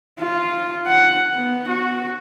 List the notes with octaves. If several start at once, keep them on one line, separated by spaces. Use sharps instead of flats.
F4
F#5
B3
F#4